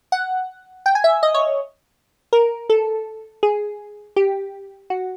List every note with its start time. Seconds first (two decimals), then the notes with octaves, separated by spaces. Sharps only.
0.12 F#5
0.86 G5
0.95 G#5
1.04 E5
1.23 D#5
1.34 C#5
2.33 A#4
2.70 A4
3.43 G#4
4.16 G4
4.90 F#4